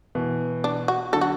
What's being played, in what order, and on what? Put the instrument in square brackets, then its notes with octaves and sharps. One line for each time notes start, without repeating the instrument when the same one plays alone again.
[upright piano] B2 E3
[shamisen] D4
F#4
[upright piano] D3 F#3 [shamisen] A4
[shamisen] F#4